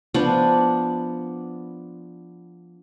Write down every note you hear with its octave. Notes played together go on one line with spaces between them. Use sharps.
F3 B3 D4